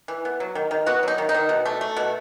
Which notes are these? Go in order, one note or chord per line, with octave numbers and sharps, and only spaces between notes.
E3
B3
F#3
D#3
D#3
B3 F#4
F#3 D#4
D#3
D#4
D#3
B2
A3
A3
B2